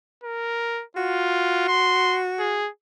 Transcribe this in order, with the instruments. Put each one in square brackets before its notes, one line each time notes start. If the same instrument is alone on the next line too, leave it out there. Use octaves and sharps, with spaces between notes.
[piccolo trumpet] A#4
[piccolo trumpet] F4 [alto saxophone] F#4
[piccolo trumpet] C6
G#4